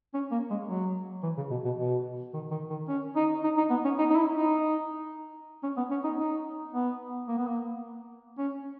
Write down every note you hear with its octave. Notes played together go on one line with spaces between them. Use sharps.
C#4
A#3
G#3
F#3
E3
C#3
B2
B2
B2
D#3
D#3
D#3
C#4
D#4
D#4
D#4
B3
C#4
D#4
D#4
E4
D#4
C#4
B3
C#4
D#4
D#4
B3
A#3
B3
A#3
C#4